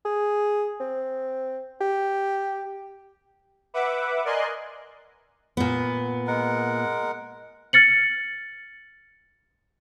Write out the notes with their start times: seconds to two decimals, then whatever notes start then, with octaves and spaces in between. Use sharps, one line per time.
0.06 G#4
0.80 C4
1.81 G4
3.74 B4 E5 F#5 D6
4.25 A#4 D5 D#5 G#5 C6 F#6
5.57 A#2 B3
6.27 G#3 A#4 F#5
7.73 F6 A6 C#7 F#7